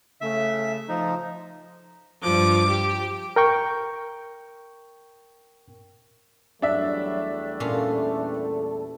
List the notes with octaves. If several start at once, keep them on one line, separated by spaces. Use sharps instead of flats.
C#3 A3 E5
F3 D#4
G2 F3 D6
G4
A#4 G5 C#6
E2 F#3 G3 A3 D4 E5
A#2 C#4 F4 A4